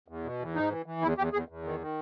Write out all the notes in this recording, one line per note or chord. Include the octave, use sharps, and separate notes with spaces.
E2
B2
E2
G#2 D#4
E3
E3
E2 E4
E2 G4
E2 G#4
E2
D#3
D#3